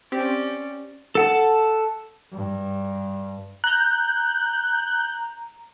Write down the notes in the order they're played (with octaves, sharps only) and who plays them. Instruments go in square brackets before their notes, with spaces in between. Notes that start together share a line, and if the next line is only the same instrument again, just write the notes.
[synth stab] C4 G4 [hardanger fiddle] C#4 D5
[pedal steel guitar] A4 F#5 A5
[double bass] G2
[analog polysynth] A#5 [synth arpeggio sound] F#6 G6